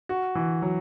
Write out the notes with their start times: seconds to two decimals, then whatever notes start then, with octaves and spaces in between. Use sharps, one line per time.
0.09 F#4
0.35 E3
0.62 F#3